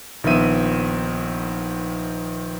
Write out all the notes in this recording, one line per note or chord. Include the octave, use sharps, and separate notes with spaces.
A#1 D#3 F3 B3 E5 D#7